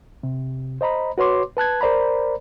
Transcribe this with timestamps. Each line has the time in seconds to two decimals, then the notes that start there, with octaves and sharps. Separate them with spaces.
0.23 C3
0.81 C5 D#5 A#5 B5
1.18 F#4 B4 C#5 C6 D6
1.57 B4 A5 F#6 G#6
1.81 A#4 C5 D5 A#5 B5